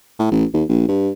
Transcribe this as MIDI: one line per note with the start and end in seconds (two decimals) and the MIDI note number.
0.19 0.28 45
0.31 0.45 33
0.54 0.64 39
0.69 0.87 34
0.88 1.11 43